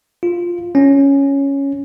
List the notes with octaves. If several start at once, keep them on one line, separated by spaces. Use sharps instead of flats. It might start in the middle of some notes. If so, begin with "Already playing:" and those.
F4
C#4